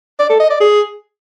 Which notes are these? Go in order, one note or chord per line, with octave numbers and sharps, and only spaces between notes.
D5
A4
D#5
D5
G#4